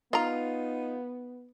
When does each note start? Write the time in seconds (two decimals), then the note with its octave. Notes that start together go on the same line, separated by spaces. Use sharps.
0.13 B3 D#4 F4 D#5 A#5